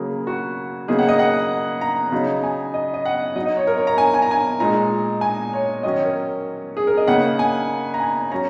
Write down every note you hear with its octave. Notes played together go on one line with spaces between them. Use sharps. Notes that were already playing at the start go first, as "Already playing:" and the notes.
Already playing: C#3 F#3 A#3 G#4
F#4
C#3 F#3 A#3 D#4 G#4
F#5
D#5
F#5
A#5
C#3 F#3 D#4
G#5
D#5
D#5
F#5
F#3 D#5
D#4
D#5
C#5
A#4
C#5
A#5
G#5
G#5
A#5
G#5
A#2 G#3 D#4 A#5
G#5
C#5
D#3 F#3 C#4 D#5
C#5
A#4
G#4
A#4
D#5
C#3 A#3 D#4 F#5
G#5
A#5
G#5
F#3 C#4 A#5